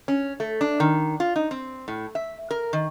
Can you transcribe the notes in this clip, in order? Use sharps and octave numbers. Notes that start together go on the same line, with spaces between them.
C#4
A3
D4
D#3
F4
D#4
C4
A2
E5
A#4
D#3